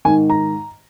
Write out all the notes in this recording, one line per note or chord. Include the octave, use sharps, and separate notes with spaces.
G#2 D#3 G#5
A#5